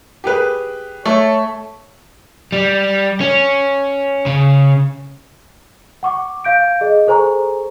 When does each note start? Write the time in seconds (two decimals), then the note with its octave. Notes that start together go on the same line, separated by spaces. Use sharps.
0.24 G4 G#4 B4
1.06 A3 C#5
2.52 G3
3.21 C#4
4.26 C#3
6.03 F#5 C#6 D6
6.44 F5 G6 D7
6.81 G#4 D#5
7.07 G#4 A4 C5 G#5 A#5 C#6